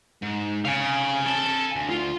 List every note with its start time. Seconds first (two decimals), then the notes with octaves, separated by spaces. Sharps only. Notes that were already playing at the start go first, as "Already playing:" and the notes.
0.22 G#2
0.65 C#3 F5 G#5
1.26 A4 A5
1.76 D2
1.89 F4